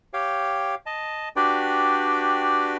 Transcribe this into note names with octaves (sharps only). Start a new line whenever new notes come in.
G4 C#5 F5 G5
D#5 A5
D4 F#4 G4 B4 D5 G5